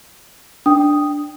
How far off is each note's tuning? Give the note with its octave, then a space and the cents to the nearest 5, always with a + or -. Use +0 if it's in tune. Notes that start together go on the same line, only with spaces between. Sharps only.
D4 +0 G5 +0 D#6 +0